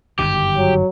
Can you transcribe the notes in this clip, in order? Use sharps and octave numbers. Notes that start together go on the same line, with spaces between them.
G1 F#2 D#3 G4
F#3